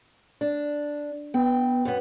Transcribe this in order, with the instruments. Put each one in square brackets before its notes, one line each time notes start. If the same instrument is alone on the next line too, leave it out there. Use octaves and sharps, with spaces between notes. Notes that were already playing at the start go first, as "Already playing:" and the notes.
[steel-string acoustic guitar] D4
[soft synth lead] B3 [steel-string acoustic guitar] G5
[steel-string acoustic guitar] F#2 B3